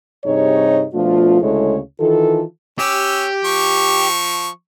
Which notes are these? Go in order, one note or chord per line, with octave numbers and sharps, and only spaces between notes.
G2 C3 D#4 G#4 C#5
B2 F3 A3 D4 F4
D2 C#3 G#3 E4 A4 C#5
D#3 E3 F4 A4
C#4 G4 E6
F3 C#6